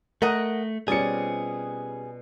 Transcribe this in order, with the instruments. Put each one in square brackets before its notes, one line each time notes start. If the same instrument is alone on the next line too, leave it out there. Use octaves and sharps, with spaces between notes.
[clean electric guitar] A3 [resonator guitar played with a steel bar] A#4 D#5 F#5
[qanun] B2 C4 F4 [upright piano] G3 C#4 C#7 [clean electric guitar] G#4 [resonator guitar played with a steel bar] D5